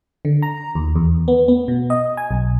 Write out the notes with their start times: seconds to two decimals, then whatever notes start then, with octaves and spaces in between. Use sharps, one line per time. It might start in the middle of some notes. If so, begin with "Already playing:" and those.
0.25 D3
0.42 A#5
0.75 D#2
0.96 E2
1.28 B3
1.48 B3
1.68 B2
1.90 D#5
2.17 G#5
2.31 B1